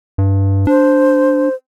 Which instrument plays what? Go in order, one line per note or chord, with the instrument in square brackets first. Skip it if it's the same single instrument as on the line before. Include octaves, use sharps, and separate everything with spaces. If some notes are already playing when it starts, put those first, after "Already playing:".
[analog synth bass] G2
[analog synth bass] D4 [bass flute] C5